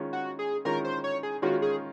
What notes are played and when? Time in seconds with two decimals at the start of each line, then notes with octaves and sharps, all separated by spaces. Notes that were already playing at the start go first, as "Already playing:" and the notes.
Already playing: D#3 G#3 C#4 F4
0.13 F#4
0.39 G#4
0.65 D#3 G#3 C#4 F4 A#4
0.84 C5
1.04 C#5
1.23 G#4
1.42 D#3 G#3 C#4 F4 F#4
1.62 G#4